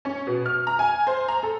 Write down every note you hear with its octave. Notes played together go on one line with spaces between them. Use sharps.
C#4
B2
F6
A#5
G#5
C5
A#5
A4